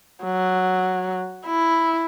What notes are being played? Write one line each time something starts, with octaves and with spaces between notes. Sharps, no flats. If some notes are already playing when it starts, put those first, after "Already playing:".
F#3
E4